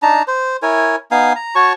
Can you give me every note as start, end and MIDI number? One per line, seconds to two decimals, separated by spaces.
0.02 0.23 62
0.02 0.23 63
0.02 0.23 81
0.02 0.23 82
0.28 0.57 72
0.62 0.96 64
0.62 0.96 70
0.62 0.96 73
0.62 0.96 80
1.11 1.33 59
1.11 1.33 63
1.11 1.33 77
1.11 1.33 80
1.35 1.55 82
1.55 1.73 66
1.55 1.73 73
1.55 1.73 81
1.55 1.73 85